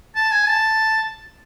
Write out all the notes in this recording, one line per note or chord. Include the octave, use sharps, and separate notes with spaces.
A5
G#5
A5